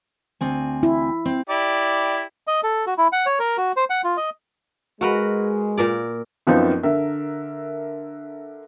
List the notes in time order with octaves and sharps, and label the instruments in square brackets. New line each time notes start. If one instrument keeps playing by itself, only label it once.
[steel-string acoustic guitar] D2 C4 G#5
[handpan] E4
[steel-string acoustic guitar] C4
[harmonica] E4 G4 D5
[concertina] D#5
A4
F#4
E4
F#5
C#5
A#4
F#4
C5
F#5
F4
D#5
[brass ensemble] G#3 [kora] F#4 A#4 B4
[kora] A#2 A#4 D5
[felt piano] F#2 F3 B3 C4 D#4
D3 A#4 E5